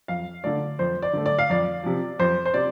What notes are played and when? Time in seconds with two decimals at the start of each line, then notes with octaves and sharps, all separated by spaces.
0.08 F2 F5
0.44 D3 A3 D5
0.79 F2 C5
1.03 D5
1.13 D3 A3
1.26 D5
1.39 F5
1.50 F2 D5
1.84 C3 F3
2.19 F2 C5
2.46 C5
2.54 C3 D5